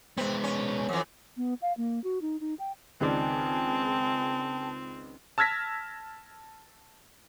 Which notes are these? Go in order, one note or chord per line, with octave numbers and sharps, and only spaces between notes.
G#3 B3 C4
C#4
F2 E3
B3
F5
A#3
F#4
D#4
D#4
G5
C#2 D#3 C4 G#4 D5 G5 A5
A5 E6 F6 G#6 A#6 B6